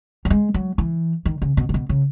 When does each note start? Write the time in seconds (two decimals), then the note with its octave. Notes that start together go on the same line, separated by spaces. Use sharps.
0.25 F#3
0.30 G#3
0.54 F#3
0.78 E3
1.25 D#3
1.42 C#3
1.57 B2
1.69 A2
1.74 B2
1.89 C#3